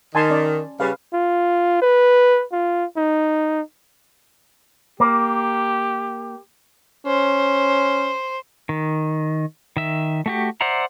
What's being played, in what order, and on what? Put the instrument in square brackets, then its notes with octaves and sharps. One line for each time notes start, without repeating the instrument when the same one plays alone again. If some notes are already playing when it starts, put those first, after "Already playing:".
[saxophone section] D#3 [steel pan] G#5 A5 C6
[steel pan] C#4 D5
[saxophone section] C#3 G3 [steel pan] B4 F5
[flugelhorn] F4
B4
F4
D#4
[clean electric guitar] A#3 [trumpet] G4
[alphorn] C#4 [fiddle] C5
[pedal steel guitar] D#3
D#3 E5
A3 F#4 G4
C5 D5 E5 F#5 A#5